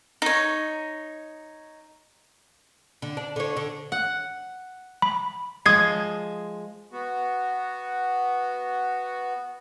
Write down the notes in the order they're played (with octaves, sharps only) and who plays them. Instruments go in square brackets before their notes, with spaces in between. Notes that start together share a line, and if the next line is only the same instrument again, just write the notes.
[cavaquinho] D#4 C#5
[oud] D3
D4
D3 C#5
D3
[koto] F#5
[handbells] B5
[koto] F3 G#3 [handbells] D#6 G#6 C7
[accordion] B3 F#4